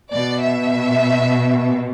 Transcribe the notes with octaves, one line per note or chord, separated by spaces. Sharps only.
B2 D5
E5